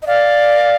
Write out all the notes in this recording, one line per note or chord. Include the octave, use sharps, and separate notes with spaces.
D#5
D5 F5